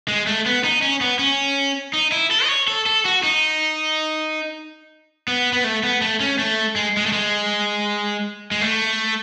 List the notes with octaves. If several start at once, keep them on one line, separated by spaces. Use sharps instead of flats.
G#3
A3
B3
D#4
C#4
B3
C#4
D#4
E4
A4
D#5
C#5
A4
A4
F#4
D#4
B3
B3
A3
B3
A3
C#4
A3
G#3
G#3
A3
G#3
G#3
A3